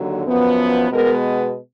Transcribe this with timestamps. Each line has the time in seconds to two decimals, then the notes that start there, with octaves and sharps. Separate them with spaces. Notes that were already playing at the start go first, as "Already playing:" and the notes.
Already playing: D#2 D3 F#3
0.26 F#2 F3 B3
0.59 B4
0.92 B2 G#3 B3 A#4